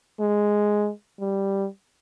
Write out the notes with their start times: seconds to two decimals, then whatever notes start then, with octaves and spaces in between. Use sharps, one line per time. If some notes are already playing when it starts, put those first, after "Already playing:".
0.20 G#3
1.20 G3